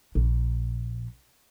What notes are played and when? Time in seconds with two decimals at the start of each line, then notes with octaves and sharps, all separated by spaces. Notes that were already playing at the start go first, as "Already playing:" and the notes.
0.15 A#1